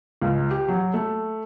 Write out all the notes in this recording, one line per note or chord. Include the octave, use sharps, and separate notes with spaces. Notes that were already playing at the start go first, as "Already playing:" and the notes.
C#2
G4
F#3
A3